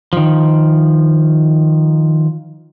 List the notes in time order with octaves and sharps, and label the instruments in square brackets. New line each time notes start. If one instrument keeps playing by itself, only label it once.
[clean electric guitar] D#3 F3